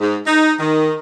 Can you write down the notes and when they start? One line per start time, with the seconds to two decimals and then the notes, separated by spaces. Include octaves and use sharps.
0.01 G#2
0.26 D#4
0.59 D#3